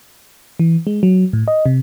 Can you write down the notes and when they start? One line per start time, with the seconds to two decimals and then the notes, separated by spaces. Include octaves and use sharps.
0.59 E3
0.87 G#3
1.03 F#3
1.33 A2
1.48 D#5
1.66 C3